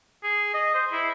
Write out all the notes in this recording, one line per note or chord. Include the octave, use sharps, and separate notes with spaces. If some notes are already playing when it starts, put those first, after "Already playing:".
G#4
D#5
C5
E4